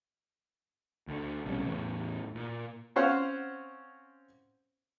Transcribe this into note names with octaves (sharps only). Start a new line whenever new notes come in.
D2 D3
B1 C3 G3 C#4
E2 A2
A#2
C4 C#4 C5 F5 F#5